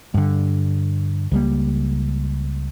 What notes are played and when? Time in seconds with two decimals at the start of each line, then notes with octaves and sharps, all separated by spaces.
0.14 G2 D3
1.32 C#2 G3 A#3